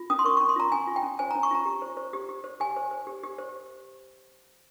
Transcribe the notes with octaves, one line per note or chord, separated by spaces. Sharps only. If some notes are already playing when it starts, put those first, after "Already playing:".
Already playing: F4
C#4 D#6
C6
A#4 C#6
C#4 C#6
C6
F4 A#5
C#4 G#5
F4
G5
C#4
C5 G#5
C#4 A#5
C#6
F4 A#5
G4
C5
C5
G4
G4
C5
G4 G#5
C5
C5
G4
G4
C5